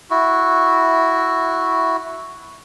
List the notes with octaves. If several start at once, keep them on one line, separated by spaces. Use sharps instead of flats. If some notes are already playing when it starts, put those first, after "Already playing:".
E4 F#4